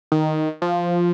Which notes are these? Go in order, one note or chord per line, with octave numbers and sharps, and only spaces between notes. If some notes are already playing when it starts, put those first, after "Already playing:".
D#3
F3